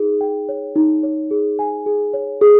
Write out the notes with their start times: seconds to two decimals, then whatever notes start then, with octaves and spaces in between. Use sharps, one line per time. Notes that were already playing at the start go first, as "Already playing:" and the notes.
Already playing: D#4 G#4
0.21 G5
0.49 C#5
0.76 D#4
1.03 C#5
1.31 G#4
1.59 G#5
1.86 G#4
2.14 C#5
2.42 G#4